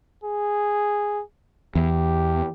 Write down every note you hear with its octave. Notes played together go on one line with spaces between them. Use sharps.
G#4
E2 G4